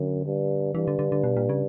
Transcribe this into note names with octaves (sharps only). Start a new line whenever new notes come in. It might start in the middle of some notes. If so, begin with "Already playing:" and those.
Already playing: F#2 D3
G2
G2 E3
D3
D3
D3
B2
A#2
C#3